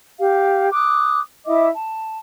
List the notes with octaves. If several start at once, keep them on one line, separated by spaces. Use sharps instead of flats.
G4 F5
D6 D#6 F#6
E4 D#5 E5 D6
A5